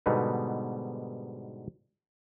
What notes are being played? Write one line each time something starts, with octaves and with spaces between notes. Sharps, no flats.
G#2 B2 D3 G3 B3 D#4